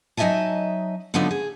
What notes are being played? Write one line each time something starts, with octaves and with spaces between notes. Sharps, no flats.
F#3 D#4 D#5 E5 G#5 A5
D3 F3 F#3 B3 D4 D#4
G#4